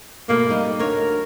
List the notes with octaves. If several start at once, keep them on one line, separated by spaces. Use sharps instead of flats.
B2 A3 A#3
G3 D#4
D2 A#4 C#5